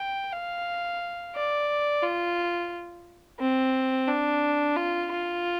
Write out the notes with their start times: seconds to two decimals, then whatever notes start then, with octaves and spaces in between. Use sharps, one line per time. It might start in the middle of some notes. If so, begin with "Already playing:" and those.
Already playing: G5
0.32 F5
1.35 D5
2.03 F4
3.39 C4
4.08 D4
4.76 F4
5.11 F4